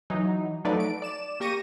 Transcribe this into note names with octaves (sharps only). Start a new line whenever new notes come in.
E3 F#3 D#4
F3 F#3 A3 D#4 B4 D5
D7
D5 E7
A#3 G4 C#6 A#6 D#7